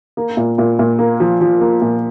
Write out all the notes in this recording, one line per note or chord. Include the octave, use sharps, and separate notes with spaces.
A#3
A#2
A#2
A#2
A#3
F3
F3
A#3
A#2